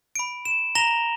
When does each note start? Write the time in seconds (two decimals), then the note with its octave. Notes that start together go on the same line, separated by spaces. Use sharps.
0.16 B5 D7
0.45 E7
0.75 A#5 A#6 E7 F7 G7